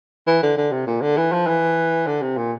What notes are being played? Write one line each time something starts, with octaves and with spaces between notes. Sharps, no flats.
E3
D3
D3
C3
A#2
D3
E3
F3
E3
D3
C3
A#2